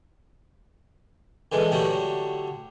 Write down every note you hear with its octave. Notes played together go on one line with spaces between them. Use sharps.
D3 E3 G#3
A2 D3 F#3 G3